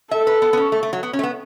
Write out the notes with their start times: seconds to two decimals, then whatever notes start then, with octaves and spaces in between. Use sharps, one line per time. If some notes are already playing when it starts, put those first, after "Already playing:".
0.11 A4 E5
0.27 B4
0.42 B3
0.53 B3
0.57 C#4
0.72 A3
0.83 A3
0.93 F#3
1.03 B3
1.13 C#4
1.19 A3
1.23 B3